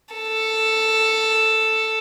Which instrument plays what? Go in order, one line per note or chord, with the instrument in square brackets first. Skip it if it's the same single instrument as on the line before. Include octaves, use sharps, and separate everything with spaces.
[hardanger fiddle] A4